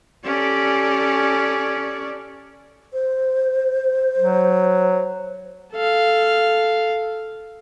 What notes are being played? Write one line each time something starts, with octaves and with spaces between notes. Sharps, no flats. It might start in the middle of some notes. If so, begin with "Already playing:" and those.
C#4 G4 A4 D5
C5
F#3
A4 F5